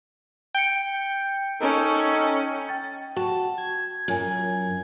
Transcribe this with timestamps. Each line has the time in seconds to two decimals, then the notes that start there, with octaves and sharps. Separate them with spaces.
0.55 G5 C#7
1.60 C#4 D#4 A4
2.69 G5 A6
3.16 F#4 A5
3.58 G#6
4.08 F#2 F4 G#5